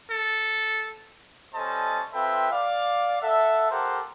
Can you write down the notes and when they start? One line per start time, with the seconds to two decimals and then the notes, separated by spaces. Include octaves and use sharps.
0.11 A4
1.55 G3 C#4 A4 C5 D#5 A5
2.14 C4 F4 A4 B4 E5 G5
2.52 D5 F5
3.22 A4 E5 F#5
3.70 G4 A4 A#4 C5 F5 F#5